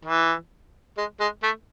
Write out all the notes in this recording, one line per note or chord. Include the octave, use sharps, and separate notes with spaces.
E3
G#3
G#3
A3